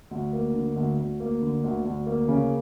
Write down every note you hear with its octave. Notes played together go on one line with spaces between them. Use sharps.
D2
A#3
D3
D2
D2
A#3
D3
D2
D2
A#3
C#3